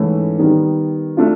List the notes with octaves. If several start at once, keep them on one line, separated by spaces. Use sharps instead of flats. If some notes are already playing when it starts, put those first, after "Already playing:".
Already playing: G#2 E3 A3 C#4
D#3 G3 B3 D#4
A3 D4 F4